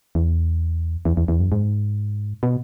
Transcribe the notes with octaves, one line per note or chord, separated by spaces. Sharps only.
E2
E2
E2
E2
F#2
G#2
B2